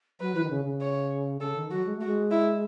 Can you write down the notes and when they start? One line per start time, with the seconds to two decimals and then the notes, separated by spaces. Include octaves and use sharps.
0.20 F#3 B4
0.35 E3
0.43 D#3
0.50 C#3
0.65 C#3
0.81 C#5
1.41 C#3 A4
1.56 D#3
1.71 F#3 F#4
1.86 G#3
1.96 A3
2.01 F#4
2.06 G#3
2.31 E4